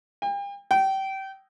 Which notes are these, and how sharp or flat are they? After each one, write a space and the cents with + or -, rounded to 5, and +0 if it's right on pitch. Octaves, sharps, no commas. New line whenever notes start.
G5 +40
G5 -25